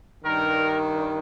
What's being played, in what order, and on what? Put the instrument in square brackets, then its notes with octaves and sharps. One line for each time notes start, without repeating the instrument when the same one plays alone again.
[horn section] G2 D#3 A#4